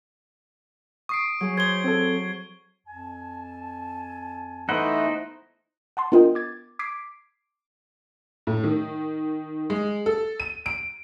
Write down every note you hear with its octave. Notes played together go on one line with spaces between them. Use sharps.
C#6 D#6 C7 D7
F#3 G#4
C5 G#6 G7
C4 A4
F2 G#5 A5
E3 A3 B3 D#4 E4 C5 F#5 F#6
F#5 A5 C6
B3 D4 F4 A#4 D#5 G5
D6 G#6 A6
D6 G#6 B6 C7 D7
A2
D#3
G#3
A4
D#7
D7